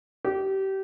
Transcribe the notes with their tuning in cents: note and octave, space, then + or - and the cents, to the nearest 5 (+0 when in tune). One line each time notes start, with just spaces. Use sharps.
G4 -25